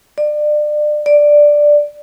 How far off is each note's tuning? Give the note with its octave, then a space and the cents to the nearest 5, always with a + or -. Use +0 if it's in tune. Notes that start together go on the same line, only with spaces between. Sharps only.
D5 +30
D5 +5